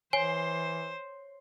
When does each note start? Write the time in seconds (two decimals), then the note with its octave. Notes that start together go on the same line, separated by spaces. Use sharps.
0.13 E3 C5 C#5 G#5 C7 G7